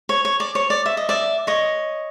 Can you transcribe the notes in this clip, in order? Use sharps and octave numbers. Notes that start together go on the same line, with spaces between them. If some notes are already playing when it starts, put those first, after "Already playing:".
C#5
C#5
D5
C#5
D5
E5
D#5
D5 E5
C#5 D#5